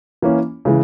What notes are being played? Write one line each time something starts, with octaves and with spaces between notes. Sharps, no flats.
E3 A#3 C#4
C#3 E3 G#3